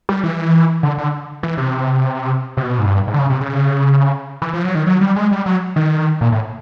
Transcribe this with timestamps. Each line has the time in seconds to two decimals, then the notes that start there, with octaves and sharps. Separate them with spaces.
0.09 G3
0.24 E3
0.83 D3
0.98 D3
1.43 E3
1.58 C3
2.57 C3
2.62 B2
2.79 G#2
2.85 G2
3.08 G#2
3.14 D3
3.19 C#3
3.30 C3
3.41 C#3
4.42 E3
4.54 F3
4.64 F#3
4.75 D#3
4.87 F#3
5.01 G3
5.16 G#3
5.31 G3
5.46 F#3
5.76 D#3
6.21 A#2
6.32 A2